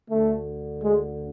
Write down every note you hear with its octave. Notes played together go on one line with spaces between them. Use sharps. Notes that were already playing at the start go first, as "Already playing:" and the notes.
D2 D3 A3
G#3